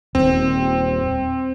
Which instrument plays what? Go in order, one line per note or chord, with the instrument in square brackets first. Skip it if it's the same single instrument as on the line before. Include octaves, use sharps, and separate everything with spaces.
[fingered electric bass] D#1 [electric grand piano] C4